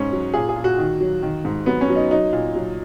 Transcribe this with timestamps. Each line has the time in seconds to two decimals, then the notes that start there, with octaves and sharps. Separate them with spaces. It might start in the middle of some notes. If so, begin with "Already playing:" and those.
Already playing: G#2 C#4
0.12 F#3
0.34 A#2 G#4
0.49 G#4
0.56 A#2
0.64 F#4
0.78 D#3
1.01 F#3
1.23 D#3
1.45 G#2
1.66 F#3 B3
1.81 C#4
1.90 F#3
1.96 D#4
2.11 F#3 D#4
2.33 A#2
2.56 F#3